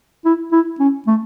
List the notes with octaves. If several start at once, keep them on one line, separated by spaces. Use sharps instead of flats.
E4
E4
C#4
A3